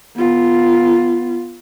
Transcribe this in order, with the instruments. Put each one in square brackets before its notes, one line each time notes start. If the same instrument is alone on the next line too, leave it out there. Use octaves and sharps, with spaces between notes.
[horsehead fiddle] B3 F4